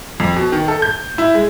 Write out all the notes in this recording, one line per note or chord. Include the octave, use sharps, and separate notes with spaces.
F2
B2
D#3
A4
G6
E4
G#3